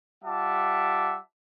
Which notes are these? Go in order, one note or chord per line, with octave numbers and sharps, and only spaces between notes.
G3 F4 E5 F#5 A5 D6